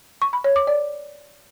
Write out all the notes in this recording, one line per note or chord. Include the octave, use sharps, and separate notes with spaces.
C#6
B5
C#5
D6
D5